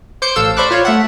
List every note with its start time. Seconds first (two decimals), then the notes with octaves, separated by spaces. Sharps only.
0.22 C5 D6 G6 C#7
0.36 A1 A4 F5 E6 E7
0.57 C5 D5 B5 C#6 D6 F#6
0.71 F4 C#5 D5 F5
0.85 A3 E5 F#5